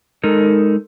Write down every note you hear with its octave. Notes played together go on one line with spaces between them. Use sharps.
G#3 D#4 A4 A#4